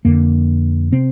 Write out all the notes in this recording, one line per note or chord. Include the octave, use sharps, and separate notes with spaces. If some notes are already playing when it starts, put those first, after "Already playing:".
F2 D3 A#3
C3 C4